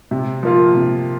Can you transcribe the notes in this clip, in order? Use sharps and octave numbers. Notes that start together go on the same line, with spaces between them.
C3
F3 A#3 F4
C3